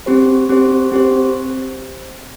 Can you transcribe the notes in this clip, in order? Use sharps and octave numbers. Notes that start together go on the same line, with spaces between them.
C4 G4 C5
C4 G4 C5
C4 G4 C5